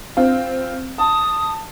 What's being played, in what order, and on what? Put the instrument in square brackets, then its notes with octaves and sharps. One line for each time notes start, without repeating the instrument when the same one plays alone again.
[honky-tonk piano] C4 F4
[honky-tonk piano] A5 [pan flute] D#6